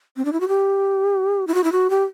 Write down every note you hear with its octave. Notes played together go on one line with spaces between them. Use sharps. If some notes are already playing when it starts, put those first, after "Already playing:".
C4
D4
E4
F#4
G4
E4
F#4
E4
F#4
G4